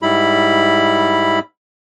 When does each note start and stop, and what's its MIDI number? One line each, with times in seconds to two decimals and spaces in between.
0.02 1.39 44
0.02 1.39 55
0.02 1.39 64
0.02 1.39 83